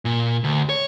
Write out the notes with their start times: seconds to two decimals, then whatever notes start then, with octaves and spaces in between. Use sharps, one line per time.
0.05 A#2
0.44 D2
0.69 C#5